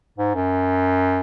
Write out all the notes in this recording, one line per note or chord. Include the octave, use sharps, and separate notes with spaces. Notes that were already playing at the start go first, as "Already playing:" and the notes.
G#2
F#2